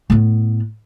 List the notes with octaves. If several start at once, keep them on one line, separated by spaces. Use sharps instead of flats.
A2 B3